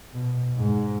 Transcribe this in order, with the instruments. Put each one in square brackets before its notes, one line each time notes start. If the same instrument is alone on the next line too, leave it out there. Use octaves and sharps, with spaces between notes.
[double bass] B2
G#2